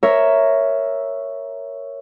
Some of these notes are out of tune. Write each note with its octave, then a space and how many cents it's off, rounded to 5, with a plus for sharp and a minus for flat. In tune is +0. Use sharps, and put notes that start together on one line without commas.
A#4 +0 C#5 +0 E5 +0